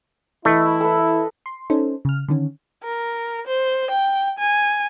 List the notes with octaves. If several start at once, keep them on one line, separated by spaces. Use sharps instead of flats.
E3 A3 E4 D#5
A4 B4
C6
C#4 D#4 A4 C5
C#3 F6
D3 D#3 C#4
A#4
C5
G5
G#5